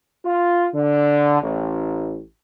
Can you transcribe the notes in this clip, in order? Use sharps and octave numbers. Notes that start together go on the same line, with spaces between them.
F4
D3
A1